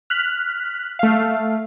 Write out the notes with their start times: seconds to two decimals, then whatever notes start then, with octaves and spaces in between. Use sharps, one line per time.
0.10 F6 F#6 B6
0.99 A3 F5